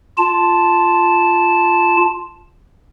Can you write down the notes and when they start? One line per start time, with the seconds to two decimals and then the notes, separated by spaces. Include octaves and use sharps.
0.18 F4 A5